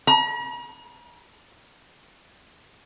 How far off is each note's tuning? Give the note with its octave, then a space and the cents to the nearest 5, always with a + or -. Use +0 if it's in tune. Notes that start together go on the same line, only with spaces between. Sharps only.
A#5 +45